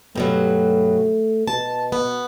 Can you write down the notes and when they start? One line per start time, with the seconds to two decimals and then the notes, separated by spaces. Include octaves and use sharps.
0.15 G2 B2 F#3 A3
1.47 B2 A5
1.92 B3